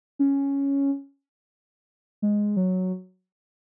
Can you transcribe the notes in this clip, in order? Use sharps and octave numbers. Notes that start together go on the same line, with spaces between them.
C#4
G#3
F#3